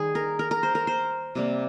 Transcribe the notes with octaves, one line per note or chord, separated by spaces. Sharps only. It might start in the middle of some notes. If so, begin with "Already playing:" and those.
Already playing: D#3 G3 G#4
A#4
A#4
A#4
C5
A#4
C5
C3 G3 A#3